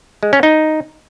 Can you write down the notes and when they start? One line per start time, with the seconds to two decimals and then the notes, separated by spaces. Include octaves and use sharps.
0.23 G#3
0.33 C#4
0.43 D#4